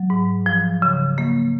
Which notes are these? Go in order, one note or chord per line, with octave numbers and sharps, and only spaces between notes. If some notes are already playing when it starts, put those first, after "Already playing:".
Already playing: F#3
G#2
F3
C#3
A#3